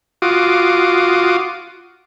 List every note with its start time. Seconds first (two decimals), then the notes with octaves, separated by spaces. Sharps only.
0.22 F4 F#4 D6 D#6